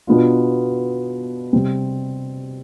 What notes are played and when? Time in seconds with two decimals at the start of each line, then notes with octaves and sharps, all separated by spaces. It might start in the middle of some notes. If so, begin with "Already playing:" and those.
0.07 B2 B3 D4 F4
1.53 C3 G3 C4